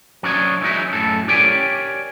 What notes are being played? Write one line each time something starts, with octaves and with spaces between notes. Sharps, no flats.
F#3 C#4 D4 C#5 D#5
E3 F#3 G#3 D#4 E4
F#2 A2 A4
G4 A#4 C#5 D5 G5 G#5